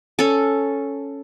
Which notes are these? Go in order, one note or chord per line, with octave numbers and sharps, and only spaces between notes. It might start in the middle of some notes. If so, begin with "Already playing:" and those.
C#4 A4